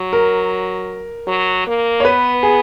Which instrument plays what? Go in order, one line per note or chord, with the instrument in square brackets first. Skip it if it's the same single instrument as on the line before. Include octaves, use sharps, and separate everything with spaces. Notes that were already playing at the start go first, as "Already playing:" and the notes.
Already playing: [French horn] F#3
[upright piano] A#4
[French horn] F#3
A#3
[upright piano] C#5
[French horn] B3 [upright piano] B4
[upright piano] G#4